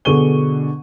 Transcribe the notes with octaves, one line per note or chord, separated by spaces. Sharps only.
B2 D3 G#4 C#6 D#7 G7